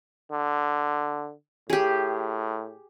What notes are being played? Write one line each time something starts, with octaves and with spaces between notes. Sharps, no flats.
D3
A2 G4 G#4